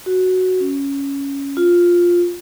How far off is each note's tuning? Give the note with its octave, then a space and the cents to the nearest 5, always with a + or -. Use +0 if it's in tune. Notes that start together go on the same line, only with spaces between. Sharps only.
F#4 +0
C#4 +5
F4 +5